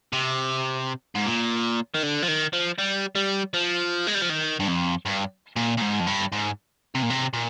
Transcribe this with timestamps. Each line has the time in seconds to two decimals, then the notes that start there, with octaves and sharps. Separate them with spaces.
0.13 C3
1.15 G#2
1.26 A#2
1.94 D#3
2.03 D3
2.22 F3
2.28 D#3
2.53 F3
2.79 G3
3.15 G3
3.54 F3
4.07 G#3
4.15 G3
4.22 F3
4.30 D#3
4.60 G2
4.68 F2
5.06 G2
5.56 A#2
5.77 A#2
5.81 G#2
6.00 F2
6.07 G2
6.32 G#2
6.95 C3
7.03 A#2
7.10 C3
7.34 A#2